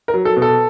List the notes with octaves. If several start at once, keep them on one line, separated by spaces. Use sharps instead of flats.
A#4
F#3
A4
B2
A4